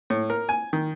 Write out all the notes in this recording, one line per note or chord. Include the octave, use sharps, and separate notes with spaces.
A2
A#4
G#5
D#3